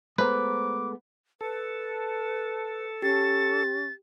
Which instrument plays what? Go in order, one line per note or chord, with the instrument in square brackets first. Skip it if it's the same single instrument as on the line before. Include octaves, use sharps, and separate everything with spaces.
[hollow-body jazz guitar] G#3 A3 B3 [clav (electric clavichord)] B4 [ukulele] C5 A#5 [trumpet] D6
[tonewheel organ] A4 [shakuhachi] B4
[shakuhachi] C#4 [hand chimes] G4 [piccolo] A6